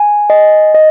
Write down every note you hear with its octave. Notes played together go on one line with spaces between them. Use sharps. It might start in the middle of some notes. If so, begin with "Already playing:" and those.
Already playing: G#5
D#5
D#5